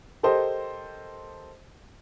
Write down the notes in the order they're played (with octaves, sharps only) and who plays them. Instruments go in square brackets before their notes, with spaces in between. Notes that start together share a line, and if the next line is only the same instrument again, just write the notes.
[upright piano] G4 A4 A#4 C5 D#5